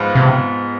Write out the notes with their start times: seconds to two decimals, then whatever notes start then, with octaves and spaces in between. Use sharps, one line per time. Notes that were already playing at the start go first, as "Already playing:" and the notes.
Already playing: G#2 F3 B3 F4
0.15 C3